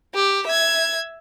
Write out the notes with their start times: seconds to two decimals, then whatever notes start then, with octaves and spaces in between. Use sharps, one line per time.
0.15 G4
0.46 E5 G#6